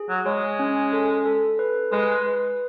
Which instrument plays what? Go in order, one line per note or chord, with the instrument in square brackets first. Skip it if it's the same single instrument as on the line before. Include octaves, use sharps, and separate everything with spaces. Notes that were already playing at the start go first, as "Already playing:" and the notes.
Already playing: [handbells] G#4
[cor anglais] F#3
[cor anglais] G#3 [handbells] C#5
[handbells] C#4
A4
A4
B4
[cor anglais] G#3 [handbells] B4
[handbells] B4